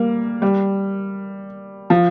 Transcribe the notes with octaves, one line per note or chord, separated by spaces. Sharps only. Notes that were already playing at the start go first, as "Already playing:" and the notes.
Already playing: G3 A#3
G3
F3